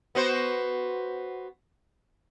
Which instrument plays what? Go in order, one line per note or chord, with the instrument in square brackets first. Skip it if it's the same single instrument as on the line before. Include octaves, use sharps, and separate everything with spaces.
[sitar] B3 F#4 C5